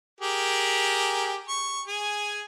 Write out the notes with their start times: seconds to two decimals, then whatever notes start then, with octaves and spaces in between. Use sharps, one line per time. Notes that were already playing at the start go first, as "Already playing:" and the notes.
0.21 G4 G#4 A#4
1.49 C#6
1.87 G#4 G#5